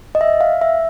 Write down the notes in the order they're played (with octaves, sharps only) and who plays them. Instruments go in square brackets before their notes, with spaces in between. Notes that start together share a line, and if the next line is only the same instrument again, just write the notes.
[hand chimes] D#5
E5
F5
E5